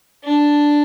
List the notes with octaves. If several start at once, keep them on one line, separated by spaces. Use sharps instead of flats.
D4